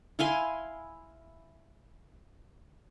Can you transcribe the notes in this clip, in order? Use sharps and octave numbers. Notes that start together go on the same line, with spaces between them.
E4 F5 G#5 C6